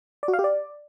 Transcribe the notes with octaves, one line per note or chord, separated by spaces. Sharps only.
D5
F#4
F5
G4
D5